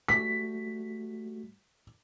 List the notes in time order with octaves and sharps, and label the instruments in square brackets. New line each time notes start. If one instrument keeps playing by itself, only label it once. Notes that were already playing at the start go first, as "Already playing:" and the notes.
[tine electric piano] G3 A3 F#4 [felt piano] B6